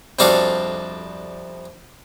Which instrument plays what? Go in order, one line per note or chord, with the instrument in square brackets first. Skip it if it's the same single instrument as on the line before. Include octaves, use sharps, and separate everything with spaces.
[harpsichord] C2 F2 D4 F#4 A4 F5